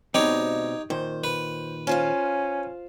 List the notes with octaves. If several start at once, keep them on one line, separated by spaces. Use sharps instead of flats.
D2 G#2 B2 G#3 C4 D#4 G4 C#5
A#2 D#3 C5
B4
C#4 F4 C5 F5